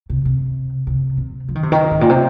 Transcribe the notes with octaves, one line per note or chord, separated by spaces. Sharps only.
C3
C3
C3
C3
F3
D#3
C3
D#3
G#2
A#2
C3